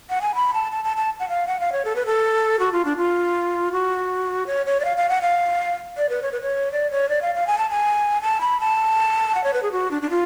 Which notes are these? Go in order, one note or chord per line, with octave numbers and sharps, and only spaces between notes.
F#5
G#5
B5
A5
A5
A5
A5
F#5
F5
F#5
F5
C#5
A4
B4
A4
F#4
F4
D4
F4
F#4
C#5
C#5
D5
F5
F5
F#5
F5
D5
B4
C#5
B4
C#5
D5
C#5
D5
F5
F5
G#5
A5
G#5
A5
B5
A5
F#5
C#5
B4
G#4
F#4
D4
D4
F4